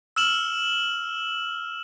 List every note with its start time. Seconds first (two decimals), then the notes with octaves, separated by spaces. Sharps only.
0.16 E6 F6 E7 F#7